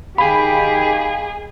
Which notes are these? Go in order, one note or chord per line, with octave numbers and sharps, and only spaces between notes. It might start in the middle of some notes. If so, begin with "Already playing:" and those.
D#3 G4 G#4 F5 B5